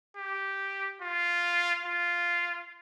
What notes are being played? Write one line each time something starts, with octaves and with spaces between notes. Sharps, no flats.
G4
F4
F4